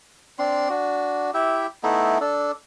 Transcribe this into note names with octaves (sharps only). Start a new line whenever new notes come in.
C4 D4 C6
D4 F#4
E4 G4 E5
A3 B3 D#4 E4
D4 A4